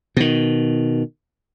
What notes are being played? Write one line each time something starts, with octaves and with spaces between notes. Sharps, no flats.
B2 D#3